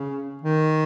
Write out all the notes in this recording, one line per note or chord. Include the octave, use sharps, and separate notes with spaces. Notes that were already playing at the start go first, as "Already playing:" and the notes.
Already playing: C#3
D#3